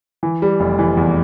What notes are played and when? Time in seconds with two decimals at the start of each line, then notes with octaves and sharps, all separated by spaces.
0.23 E3
0.42 G3
0.60 F1
0.79 E3
0.97 E2